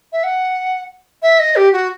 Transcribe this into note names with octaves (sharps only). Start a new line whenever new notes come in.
E5
F#5
E5
D#5
G4
F#4